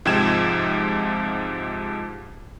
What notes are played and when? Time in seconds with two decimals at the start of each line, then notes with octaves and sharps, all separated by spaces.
0.05 G#2 C3 F3 G5 G#6 E7